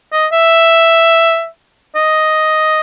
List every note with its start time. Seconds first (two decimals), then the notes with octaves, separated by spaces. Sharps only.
0.13 D#5
0.33 E5
1.95 D#5